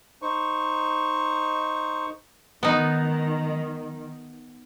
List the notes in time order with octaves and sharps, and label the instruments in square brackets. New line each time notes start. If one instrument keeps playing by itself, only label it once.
[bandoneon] D#4 C5 C#6
[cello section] D#3 [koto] B3 D#4